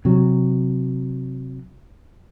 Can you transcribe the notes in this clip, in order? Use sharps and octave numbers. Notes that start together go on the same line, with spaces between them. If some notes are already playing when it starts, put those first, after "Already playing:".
C3 F#3